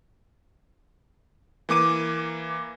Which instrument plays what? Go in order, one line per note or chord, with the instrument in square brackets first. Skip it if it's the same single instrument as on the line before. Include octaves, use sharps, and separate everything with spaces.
[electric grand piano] E3 A#3 D6 D#7